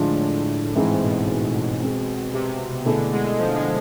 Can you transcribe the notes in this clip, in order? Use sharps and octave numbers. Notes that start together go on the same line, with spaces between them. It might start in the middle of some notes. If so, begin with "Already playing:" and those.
Already playing: A2 D3 F3 G#3 D4 F4
G#2 E3 G#3 C4 G#4
A2
B2
G#3 C4 G#4
C3
B2 D3 A3 E4 G#4
G#3
G#3
F3
G#3